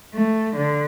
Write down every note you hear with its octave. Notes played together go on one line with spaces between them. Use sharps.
A3
D3